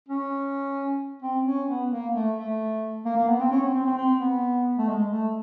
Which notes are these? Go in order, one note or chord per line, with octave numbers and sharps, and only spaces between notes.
C#4
C4
C#4
B3
A#3
A3
A3
A#3
A#3
B3
C4
C#4
C4
C4
C4
C4
B3
A3
G#3
A3